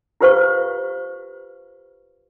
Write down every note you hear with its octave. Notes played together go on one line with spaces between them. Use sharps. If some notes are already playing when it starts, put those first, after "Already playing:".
F4 G4 B4 C5 F5 C#6